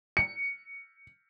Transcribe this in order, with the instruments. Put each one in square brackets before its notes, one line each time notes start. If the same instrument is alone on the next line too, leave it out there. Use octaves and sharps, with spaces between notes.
[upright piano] C#7